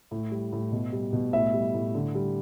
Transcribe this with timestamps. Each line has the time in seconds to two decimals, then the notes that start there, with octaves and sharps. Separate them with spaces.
0.11 A2
0.31 G3
0.52 A2
0.72 B2
0.92 G3
1.13 B2
1.33 A2 E5
1.54 G3
1.74 A2
1.95 D3
2.15 G3